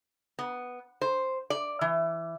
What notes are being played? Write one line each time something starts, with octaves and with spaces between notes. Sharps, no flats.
B3
C5
D5
E3